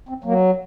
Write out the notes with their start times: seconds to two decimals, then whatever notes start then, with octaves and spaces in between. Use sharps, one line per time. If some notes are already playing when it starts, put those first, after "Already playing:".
0.09 C4
0.24 F#3 A#3